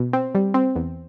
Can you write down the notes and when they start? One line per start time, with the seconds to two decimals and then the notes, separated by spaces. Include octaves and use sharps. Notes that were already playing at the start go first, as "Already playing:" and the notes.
Already playing: B2
0.13 C4
0.35 G3
0.54 C4
0.75 E2